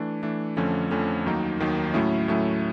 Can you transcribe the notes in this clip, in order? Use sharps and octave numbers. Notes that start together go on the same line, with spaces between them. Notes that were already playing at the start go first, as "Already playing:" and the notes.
Already playing: E3 A3 D4
E3 A3 D4
F2 D3 F3 A3 C#4
F2 D3 F3 A3 C#4
D#2 D#3 F#3 A#3 D#4
D#2 D#3 F#3 A#3 D#4
A2 F#3 A3 C#4 E4
A2 F#3 A3 C#4 E4